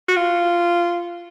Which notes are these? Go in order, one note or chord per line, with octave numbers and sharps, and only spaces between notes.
F#4
F4